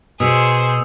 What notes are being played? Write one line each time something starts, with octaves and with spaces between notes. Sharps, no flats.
B2 G#4 C5 D#6 E6 C#7